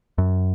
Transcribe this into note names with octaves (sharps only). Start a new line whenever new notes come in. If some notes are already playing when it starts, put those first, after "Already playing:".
F#2